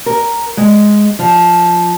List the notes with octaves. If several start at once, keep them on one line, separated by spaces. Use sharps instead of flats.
A#4
G#3
F3